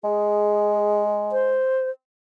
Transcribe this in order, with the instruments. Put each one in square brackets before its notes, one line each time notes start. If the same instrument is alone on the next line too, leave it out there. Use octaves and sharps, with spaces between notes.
[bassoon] G#3 [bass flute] G#4
[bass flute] C5